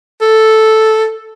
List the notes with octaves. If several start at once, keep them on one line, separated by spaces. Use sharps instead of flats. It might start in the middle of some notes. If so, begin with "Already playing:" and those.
A4